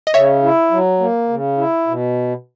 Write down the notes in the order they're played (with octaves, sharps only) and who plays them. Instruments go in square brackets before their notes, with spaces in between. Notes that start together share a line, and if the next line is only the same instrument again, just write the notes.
[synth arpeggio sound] D#5
[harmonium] C#3 [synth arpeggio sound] C#5 E5
[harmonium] E4
F#3
A#3
C#3
E4
B2